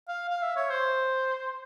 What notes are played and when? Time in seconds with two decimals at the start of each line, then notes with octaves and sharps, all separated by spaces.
0.08 F5
0.29 F5
0.43 E5
0.56 C#5
0.70 C5